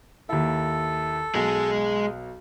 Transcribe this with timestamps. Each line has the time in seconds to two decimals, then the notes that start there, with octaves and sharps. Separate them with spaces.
0.29 D#2 E4 A4
1.35 B1 G#3 G#4